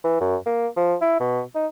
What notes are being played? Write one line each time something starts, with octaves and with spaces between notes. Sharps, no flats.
E3
F#2
A#3
F3
E4
B2
D#4